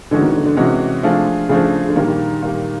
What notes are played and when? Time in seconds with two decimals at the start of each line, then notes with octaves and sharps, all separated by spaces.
0.11 D3 E3 G#3 C#4 F#4
0.22 D#3
0.35 D3
0.45 D3
0.57 C3 E3 G#3 C#4 F#4
1.03 F3 A3 D4 F4 G#4
1.49 C#3 F3 A3 D4 F4 G#4
1.89 D3
1.96 A#2 D#3 G3 A#3
2.42 A#2 G3 A#3